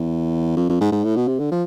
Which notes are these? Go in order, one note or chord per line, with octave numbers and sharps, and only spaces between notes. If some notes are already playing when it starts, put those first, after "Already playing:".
Already playing: E2
F2
F2
G#2
G#2
A2
B2
C3
D3
F3